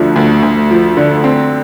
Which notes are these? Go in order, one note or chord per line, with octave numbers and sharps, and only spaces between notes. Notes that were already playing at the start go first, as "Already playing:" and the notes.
Already playing: D2 D3 F3
D2
D2
F3
D3
C4